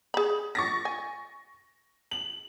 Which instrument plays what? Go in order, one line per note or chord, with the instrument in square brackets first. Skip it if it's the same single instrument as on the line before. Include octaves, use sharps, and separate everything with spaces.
[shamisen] G#4 B5
[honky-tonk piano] C#6 A6 A#6
[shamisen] G#5
[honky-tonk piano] F#7